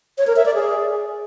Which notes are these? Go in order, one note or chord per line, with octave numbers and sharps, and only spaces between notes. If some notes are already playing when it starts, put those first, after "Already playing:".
C#5
A#4
E5
D5
G#4